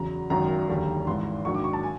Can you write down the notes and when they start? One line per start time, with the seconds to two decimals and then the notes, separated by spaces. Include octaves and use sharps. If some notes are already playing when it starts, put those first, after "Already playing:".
Already playing: E2 C#3 F#3 A#5
0.30 G#1 F#2 D#3 F#3 A#5
0.68 F1 D#2 D3 G3
1.06 G#1 G#2 E3 C6
1.45 A#1 G#2 D#3 F#3 C#6
1.54 D6
1.64 C#6
1.73 A5
1.83 G#5